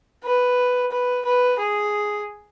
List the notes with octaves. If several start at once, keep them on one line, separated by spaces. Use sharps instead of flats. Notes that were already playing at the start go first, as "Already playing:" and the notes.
B4
B4
B4
G#4